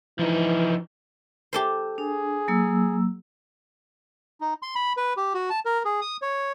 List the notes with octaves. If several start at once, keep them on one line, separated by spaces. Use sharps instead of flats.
E3 F3 D#4
G4 A4 C5
D4 G#4
F#3 A#3 E6
D#4
C6
B5
B4
G4
F#4
A5
A#4
G#4
D#6
C#5